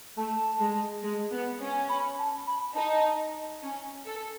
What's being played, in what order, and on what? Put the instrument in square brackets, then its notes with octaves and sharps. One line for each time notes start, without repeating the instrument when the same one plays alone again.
[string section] A3 [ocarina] A5
[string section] G#3
G#3
B3
C#4
[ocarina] B5
A5
B5
[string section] D#4 [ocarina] A5
[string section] C#4
A4